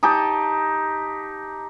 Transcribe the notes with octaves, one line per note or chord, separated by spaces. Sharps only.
D#4 G4 A5